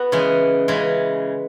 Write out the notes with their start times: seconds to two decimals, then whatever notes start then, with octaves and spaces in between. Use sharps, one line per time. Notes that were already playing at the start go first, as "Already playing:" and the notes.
Already playing: B3 F#4
0.12 C#3 E3 G#3
0.68 C#3 E3 G#3